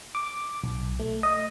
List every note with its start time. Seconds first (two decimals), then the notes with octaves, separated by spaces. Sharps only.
0.15 D6
0.64 B1
1.00 A3
1.23 D#5